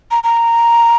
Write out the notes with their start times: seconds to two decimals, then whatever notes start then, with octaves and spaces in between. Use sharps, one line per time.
0.11 A#5
0.23 A#5